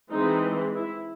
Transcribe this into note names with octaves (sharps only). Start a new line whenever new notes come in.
E3 G#3 C4 D#4
E4